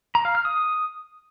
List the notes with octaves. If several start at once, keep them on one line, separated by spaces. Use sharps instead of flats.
A#5
F5
F6
D#6